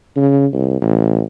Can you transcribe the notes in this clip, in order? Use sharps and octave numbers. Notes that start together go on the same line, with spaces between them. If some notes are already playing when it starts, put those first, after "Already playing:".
C#3
C2
A1